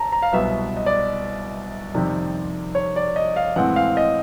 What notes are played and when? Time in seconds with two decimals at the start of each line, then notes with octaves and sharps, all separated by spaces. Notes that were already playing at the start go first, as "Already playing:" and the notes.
Already playing: A5 A#5
0.12 A#5
0.22 F5
0.33 C2 B2 F#3 B3 E5
0.77 D#5
0.86 D5
1.94 F2 C3 D#3 G3
2.75 C#5
2.96 D5
3.16 D#5
3.36 F5
3.56 A2 E3 G#3 C4 F#5
3.76 F5
3.97 D#5